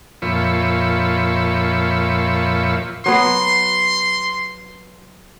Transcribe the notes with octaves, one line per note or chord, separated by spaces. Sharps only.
F2 A#2 F3 C#5 E5 B5
F#3 B3 C6